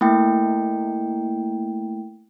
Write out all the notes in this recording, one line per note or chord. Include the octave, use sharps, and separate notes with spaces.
A3 A#3 E4 G5